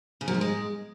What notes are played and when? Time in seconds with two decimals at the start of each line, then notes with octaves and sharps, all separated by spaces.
0.21 C#3
0.28 F#2
0.34 G#2
0.41 G#3